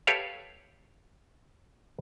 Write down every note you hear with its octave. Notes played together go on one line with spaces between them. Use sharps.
G4 A4 B4 C#5 E5 F5